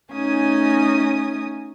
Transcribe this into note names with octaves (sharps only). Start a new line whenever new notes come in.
A3 C#4 D#4 G#5 D#6